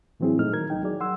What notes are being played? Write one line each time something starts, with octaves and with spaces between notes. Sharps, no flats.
A2 E3 F#3 C4 E4 G#4
A#2 A3 D#4 F6
D#3 F#3 A#4 G#6
C2 D#4 G5
F#3 G#4 D5
F#5 C6 E6